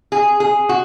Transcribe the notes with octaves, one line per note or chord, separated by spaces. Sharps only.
G#4
G#4
F#4